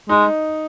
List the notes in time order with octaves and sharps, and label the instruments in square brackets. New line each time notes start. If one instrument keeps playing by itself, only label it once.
[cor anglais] G#3 [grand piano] D#4